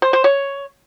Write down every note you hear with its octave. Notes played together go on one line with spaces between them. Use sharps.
C5
C5
C#5